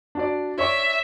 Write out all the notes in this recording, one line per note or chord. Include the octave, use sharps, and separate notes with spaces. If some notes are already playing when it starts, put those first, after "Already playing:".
D4 F#4 D5
C#5 D5 E5 C#6